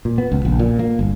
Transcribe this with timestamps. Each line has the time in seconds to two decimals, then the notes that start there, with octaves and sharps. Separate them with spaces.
0.05 A#2
0.18 B3
0.32 C#2
0.45 A#1
0.59 A#2
0.79 A#3
0.99 G1